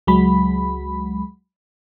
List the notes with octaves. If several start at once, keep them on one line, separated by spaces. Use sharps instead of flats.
C#2 F#3 G#3 B5